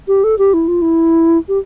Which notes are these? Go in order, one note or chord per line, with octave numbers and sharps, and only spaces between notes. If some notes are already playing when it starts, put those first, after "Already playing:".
G4
A4
G4
E4
F4
E4
G4